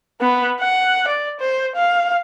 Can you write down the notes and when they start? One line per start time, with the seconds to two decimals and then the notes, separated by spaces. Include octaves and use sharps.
0.21 B3
0.60 F#5
1.08 D5
1.40 C5
1.76 F5